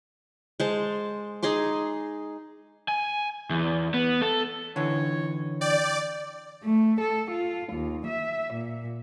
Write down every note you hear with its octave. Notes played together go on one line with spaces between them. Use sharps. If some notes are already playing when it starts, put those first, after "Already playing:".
G#3 C5 A5
D#4 G#4 C6 D6
G#5
E2
B3
A4
D3 E3 C#5
D5 G5
A3
A4
F4
D#2
E5
A#2